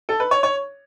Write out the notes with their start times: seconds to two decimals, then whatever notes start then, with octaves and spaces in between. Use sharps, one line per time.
0.09 A4
0.20 B4
0.31 C#5
0.43 C#5